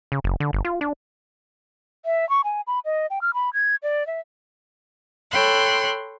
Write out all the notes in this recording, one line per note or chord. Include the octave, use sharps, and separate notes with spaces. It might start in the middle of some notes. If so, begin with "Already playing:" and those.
C#3
F#1
D3
G1
F4
D4
E5
C#6
G#5
B5
D#5
G5
F6
B5
G#6
D5
E5
A4 C#5 G5 B5 C6 F#6